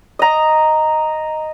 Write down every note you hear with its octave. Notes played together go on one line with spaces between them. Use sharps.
D#5 A#5